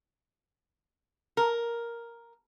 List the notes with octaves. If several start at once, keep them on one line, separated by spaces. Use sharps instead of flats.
A#4